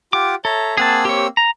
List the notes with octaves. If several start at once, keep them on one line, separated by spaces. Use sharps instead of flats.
F4 G4 F#5 D6
A4 C#5 E5 A#5
A#3 C4 G#4 F#5 A5 E6
G4 C#5
A#5